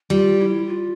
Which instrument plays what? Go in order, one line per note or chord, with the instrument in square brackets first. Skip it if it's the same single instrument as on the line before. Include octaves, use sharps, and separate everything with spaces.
[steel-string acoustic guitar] G3 [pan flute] F4
[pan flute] E4
F4